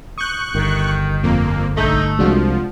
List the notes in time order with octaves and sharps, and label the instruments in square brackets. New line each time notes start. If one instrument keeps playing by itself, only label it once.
[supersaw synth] C#6 F#6 [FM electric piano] D#6 G6
[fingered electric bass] G1 [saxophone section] D#3
[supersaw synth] F2 A#3
[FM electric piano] A#1 D3 G6 [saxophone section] A3 [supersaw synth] D#4
[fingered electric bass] C2 [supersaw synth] F3 [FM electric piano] G#3 D4 F#4